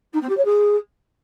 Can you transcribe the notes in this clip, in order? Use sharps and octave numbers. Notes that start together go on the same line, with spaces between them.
D#4
C4
G4
C#5
G#4